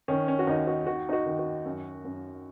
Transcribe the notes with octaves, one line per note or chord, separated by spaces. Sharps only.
D#3 C#4
C#4
F#4
D#2 D#4
F#4
D#3 F#4
D#4
F#4
D#3
F#4
F#2
F#2